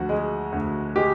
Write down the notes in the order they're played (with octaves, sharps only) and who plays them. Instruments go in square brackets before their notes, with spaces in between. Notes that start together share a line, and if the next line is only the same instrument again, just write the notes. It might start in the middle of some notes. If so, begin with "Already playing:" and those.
Already playing: [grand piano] D2 F3 F#4
G#3
D2
G#3 G4